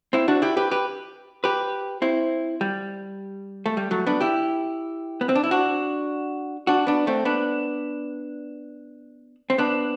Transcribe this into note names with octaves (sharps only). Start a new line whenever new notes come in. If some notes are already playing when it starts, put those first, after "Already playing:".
C4 E4
D4 F#4
E4 G4
G4 B4
G4 B4
G4 B4
C4 E4
G3
A3
G3
F#3 A3
B3 D4
E4 G4
B3
C4
D4
E4
D4 F#4
D4 F#4
B3 D4
A3 C4
B3 D4
C4
B3 D4